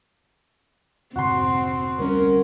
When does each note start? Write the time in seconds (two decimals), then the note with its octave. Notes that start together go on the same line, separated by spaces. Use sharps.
1.16 F1 G#2 D3 C4 F#4 C6
1.99 D2 G3 C4 C#4 A#4